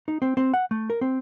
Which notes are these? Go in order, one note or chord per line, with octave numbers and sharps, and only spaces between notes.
D#4
C4
C4
F#5
A3
A#4
C4